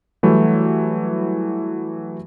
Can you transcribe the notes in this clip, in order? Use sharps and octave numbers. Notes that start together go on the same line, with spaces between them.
E3 F#3 G3 A3 E4